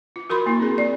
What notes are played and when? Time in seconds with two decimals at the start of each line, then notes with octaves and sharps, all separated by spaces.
0.16 F4
0.30 F#4 A#4 B5 C6
0.46 A#3 E4
0.60 C4 G#4
0.78 D5